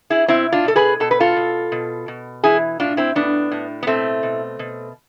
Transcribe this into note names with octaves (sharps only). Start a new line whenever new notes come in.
E4 G#4
B2 C4 E4
D4 F4
B2 A4
G#4 B4
B2 A4
B4
F4 A4
B2
B2
B2
E3 E4 G#4
A2 D4 F4
C4 E4
A2 B3 D4
A2
B3
B2 A3 C4
B2
B2